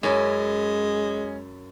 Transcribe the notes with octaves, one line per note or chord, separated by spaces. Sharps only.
F#2 G#3 C#4 E4